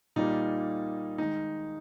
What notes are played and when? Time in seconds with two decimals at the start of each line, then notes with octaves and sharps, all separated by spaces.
0.16 A#2 G3 A#3 D#4
1.18 D#3 G#3 D#4